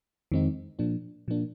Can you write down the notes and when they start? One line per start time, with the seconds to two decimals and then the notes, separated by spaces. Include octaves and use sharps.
0.32 F2 D#3 G#3 C4 D#4
0.79 A#2 F3 A#3 D4
1.28 A#2 F3 A#3 D4